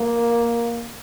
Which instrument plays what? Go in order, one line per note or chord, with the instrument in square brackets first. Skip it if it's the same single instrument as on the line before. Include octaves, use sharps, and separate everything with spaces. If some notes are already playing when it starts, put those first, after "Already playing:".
Already playing: [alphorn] A#3